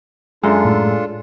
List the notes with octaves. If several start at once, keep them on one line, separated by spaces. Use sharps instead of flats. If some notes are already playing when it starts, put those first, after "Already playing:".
F#2 G#3 D4 F4 A4
A2